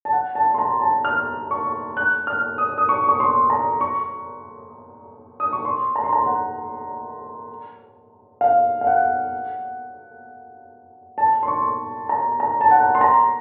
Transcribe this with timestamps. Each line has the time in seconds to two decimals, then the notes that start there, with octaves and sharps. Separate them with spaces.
0.05 A5
0.13 F#5
0.35 A5
0.54 C6
0.58 A#5
0.81 A5
1.05 F6
1.51 C#6
1.97 F#6
2.27 F6
2.58 D#6
2.78 D#6
2.89 C#6
3.09 C#6
3.20 C6
3.50 A#5
3.81 C#6
5.40 D#6
5.53 C#6
5.65 C6
5.96 A#5
6.04 C6
6.13 A#5
6.26 F#5
8.41 F5
8.81 F5
8.87 F#5
11.18 A5
11.43 C6
11.48 C#6
12.09 A#5
12.40 A#5
12.61 A5
12.71 F#5
12.95 C6
13.01 A#5